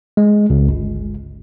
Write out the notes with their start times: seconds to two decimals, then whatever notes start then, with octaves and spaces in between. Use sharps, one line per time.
0.17 G#3
0.50 C#2
0.69 G1